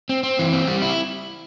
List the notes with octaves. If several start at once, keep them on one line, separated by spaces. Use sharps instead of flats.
C4
C4
E3
C4
G3
E4